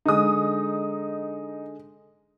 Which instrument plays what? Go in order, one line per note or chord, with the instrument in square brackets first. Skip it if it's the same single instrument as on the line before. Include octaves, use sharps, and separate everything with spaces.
[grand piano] D3 G#3 [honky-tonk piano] D#4 D#6